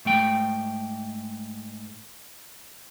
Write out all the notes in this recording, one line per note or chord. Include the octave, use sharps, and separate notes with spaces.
G#2 A3 G5